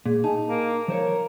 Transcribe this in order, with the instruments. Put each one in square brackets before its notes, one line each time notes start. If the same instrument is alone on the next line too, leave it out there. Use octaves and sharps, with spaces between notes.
[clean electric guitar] A#2 [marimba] G#4
[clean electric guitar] D#4 [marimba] G#5 A5
[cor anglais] A#3
[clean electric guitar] F3 C5 C#5 [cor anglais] A#4